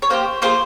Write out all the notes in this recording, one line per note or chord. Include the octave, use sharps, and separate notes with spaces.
C#5
A#3 E4 G4 C5
A#3 F4 G#4 C5